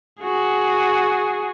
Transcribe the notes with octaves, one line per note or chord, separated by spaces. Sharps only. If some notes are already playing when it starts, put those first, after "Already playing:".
F#4 G#4